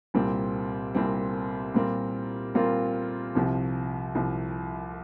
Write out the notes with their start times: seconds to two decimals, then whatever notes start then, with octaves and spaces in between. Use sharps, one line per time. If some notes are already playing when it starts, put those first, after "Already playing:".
0.14 C2 A#2 G3 C4
0.95 C2 A#2 G3 C4
1.74 A#2 G3 C4 F4 A#4
2.55 A#2 G3 C4 F4 A#4
3.35 C2 C3 F3
4.15 C2 C3 F3